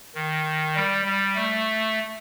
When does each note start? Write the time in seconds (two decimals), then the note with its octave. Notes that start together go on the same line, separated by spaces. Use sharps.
0.15 D#3
0.75 G3
1.05 G3
1.36 A3